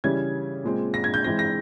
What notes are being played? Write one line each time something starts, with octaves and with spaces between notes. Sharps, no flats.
C#3 E3 G3 C#4 G#6
A#2 G#3 C4
A#6
G#6
G6
E3 G#3 C4 A#6
A#6